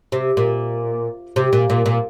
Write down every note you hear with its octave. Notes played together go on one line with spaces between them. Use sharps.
C3
A#2
C3
A#2
A#2
A#2